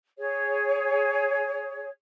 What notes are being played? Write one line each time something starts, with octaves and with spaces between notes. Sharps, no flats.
G#4 C#5